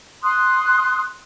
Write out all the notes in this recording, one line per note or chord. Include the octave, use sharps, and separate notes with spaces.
C6 D#6 F#6